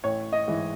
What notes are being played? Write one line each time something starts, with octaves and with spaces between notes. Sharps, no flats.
A1 C#5
D#5
G#2 E3